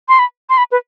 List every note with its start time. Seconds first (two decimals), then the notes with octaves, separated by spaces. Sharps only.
0.09 C6
0.19 B5
0.50 C6
0.58 B5
0.72 B4